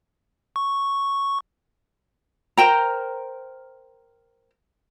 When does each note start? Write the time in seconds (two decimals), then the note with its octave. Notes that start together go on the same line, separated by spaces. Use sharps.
0.56 C#6
2.57 A#4 C5 G5 A#5